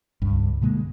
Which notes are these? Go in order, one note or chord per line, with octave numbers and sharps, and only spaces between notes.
C#2 G2
B2 D3 G#3 A#3